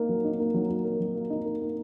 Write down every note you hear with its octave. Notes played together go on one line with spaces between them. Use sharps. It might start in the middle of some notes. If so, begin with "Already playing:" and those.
Already playing: A#3 D#4
F#3
D#4
A#3
F#3
F#3
A#4
F#3
A#3
D#4
A#4
A#3